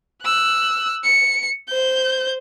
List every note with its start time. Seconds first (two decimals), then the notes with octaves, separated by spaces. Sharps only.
0.23 E6 F#6
1.04 C#7
1.69 C5 G6